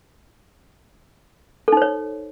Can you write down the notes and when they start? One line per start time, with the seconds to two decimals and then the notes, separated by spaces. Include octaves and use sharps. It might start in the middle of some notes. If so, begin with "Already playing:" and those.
1.68 A4
1.72 D#4
1.77 C5
1.82 C#5